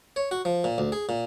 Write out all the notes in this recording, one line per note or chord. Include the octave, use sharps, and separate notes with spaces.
C#5
F#4
F3
A#2
D2
G#4
A#2